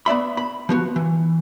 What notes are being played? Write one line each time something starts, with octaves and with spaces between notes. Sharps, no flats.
B3 D5 E5 B5
B5
F3 B3 F#4
E3